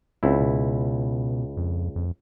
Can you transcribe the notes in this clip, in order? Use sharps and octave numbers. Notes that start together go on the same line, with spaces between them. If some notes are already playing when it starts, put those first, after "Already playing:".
C#2 C4 E4
B2
F2
F2